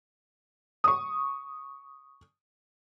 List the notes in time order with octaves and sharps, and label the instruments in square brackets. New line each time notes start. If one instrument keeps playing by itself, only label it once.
[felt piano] C#6 D#6